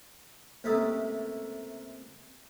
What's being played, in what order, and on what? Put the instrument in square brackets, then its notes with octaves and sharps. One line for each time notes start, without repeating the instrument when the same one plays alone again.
[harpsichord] C#2 C3 A3 A#3 A4 D#6